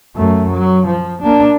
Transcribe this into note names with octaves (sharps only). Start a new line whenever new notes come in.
F#2 A3
F#3
F3
A#3 D4